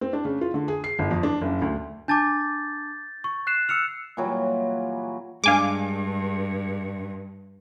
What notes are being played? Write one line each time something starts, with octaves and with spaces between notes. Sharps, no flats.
C4
D4
C#3
F4
D3
G#4
C7
G1
F2
D4
F#1
D2
D4 A5 D6 G6 A6
C#6
F#6 C7 E7
E6 F6 C#7 F7
A#2 E3 F#3 G3
G2 G#3 D4 F5 G#5 D6